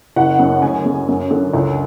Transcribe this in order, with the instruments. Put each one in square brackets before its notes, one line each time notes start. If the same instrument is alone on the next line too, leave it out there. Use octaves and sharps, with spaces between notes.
[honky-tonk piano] F#1 F#5
F#2
D2 G#5
C#3
F#2
D3
C#2